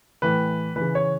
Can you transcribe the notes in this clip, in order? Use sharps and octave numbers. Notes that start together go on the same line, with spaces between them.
A2 E3 B4
E3 B4
C#3
C#5